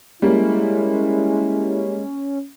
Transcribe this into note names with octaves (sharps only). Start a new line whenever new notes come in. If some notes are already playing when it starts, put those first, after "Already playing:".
G3 G#3 A#3 C#4 E4